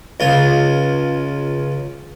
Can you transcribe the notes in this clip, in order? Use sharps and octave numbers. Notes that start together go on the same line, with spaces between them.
C#2 F4